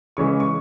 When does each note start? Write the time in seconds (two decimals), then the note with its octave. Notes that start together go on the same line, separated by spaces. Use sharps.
0.17 C#3 E3 G#3 C#6
0.40 C#6